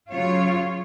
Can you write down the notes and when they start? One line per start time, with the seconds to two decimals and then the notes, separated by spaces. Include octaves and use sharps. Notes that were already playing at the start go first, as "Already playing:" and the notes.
0.10 C#3 F#3 F4 C#5